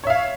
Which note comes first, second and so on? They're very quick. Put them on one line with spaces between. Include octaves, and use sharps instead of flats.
C#5 E5 F5